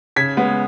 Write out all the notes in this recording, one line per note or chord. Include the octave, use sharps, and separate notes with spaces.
C#3 G#6 B6
G#3 B3